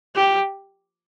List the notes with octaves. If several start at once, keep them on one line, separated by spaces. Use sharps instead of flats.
G4